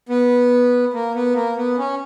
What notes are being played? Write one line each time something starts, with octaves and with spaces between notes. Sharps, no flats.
B3
A#3
B3
A#3
B3
C#4